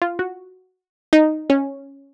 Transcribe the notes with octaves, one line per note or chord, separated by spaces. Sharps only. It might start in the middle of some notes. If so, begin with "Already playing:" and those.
F4
F#4
D#4
C#4